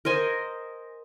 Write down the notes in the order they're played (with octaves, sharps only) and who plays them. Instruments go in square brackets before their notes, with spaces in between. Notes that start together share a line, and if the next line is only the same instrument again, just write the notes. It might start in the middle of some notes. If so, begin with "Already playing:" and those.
[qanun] A#4 C5 D#5 G#5